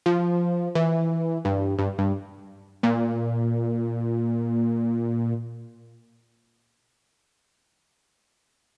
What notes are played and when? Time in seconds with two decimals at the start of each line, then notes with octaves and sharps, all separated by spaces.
0.06 F3
0.75 E3
1.45 G2
1.79 G2
1.98 G2
2.83 A#2